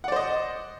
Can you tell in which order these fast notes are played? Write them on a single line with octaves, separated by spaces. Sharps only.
F#5 D5 C5 D#5